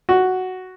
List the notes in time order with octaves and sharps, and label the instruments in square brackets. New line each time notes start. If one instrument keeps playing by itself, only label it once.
[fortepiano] F#4